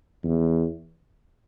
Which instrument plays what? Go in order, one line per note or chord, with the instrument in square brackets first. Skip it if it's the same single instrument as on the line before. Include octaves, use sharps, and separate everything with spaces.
[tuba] E2